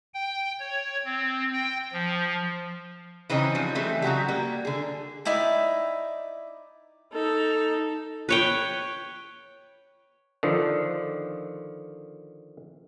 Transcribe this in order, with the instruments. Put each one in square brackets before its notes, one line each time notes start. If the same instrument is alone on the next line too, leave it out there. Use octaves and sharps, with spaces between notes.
[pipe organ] G5
C#5
C4
G5
F3
[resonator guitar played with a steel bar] C#3 E3 C4 C#4 D#4
F3 G3 C#4
E3 G3 A3 C4 G#4
C#3 F#3 F#4 G4
G3 A#3
D3 G#4
[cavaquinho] D#4 E4 D5 G5
[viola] D#4 A4
[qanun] B4 C#5 G5
[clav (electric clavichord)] D3 D#3 F3